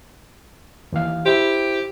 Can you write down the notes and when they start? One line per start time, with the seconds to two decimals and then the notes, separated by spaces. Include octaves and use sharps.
0.92 D#2 E3 F5
1.26 E4 G4 C5